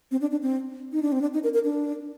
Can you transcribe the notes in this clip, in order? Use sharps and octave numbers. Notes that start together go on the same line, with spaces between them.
C4
D4
D4
C4
D#4
D4
C4
D4
D#4
A#4
A#4
D4